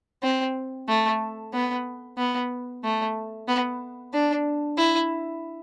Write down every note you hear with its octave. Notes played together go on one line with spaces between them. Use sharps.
C4
A3
B3
B3
A3
B3
D4
E4